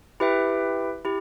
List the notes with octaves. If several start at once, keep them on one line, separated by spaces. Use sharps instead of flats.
E4 G4 B4 E5 G5
E4 G4